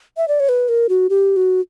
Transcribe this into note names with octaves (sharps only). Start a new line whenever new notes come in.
E5
D5
C#5
B4
A#4
F#4
G4
F#4